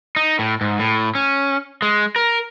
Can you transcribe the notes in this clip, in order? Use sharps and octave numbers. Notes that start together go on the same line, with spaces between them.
D#4
A2
G#2
A2
C#4
G#3
A#4